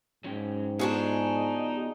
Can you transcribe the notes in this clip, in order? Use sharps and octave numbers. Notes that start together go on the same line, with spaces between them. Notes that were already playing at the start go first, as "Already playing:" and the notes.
G#2 F#3 C#4 G5
B3 D4 D#4 F4 F#4 G#4